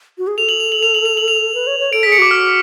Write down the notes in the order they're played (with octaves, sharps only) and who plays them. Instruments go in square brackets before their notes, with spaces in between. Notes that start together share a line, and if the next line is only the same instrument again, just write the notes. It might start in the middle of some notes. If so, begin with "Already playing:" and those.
[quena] F#4
G#4
[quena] A4 [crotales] F7
[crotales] F#7
F7
F#7
F7
F#7
F7
F#7
F7
[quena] B4
C#5
C#5
[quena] A4 [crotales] D7
[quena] G#4 [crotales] B6
[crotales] C#7
[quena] F#4 [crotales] D6
[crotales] F6